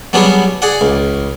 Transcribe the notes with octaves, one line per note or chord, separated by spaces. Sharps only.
F#3 G3 B3 D4 G#4 C#5
G#4 D5 F#5
C#2